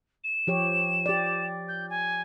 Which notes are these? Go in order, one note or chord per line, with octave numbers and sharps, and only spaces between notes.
E7
F3 G4 C#5
G4 D5
G6
G#5